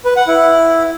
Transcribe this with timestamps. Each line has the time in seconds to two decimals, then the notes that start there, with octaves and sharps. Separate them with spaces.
0.05 B4
0.16 F#5
0.28 E4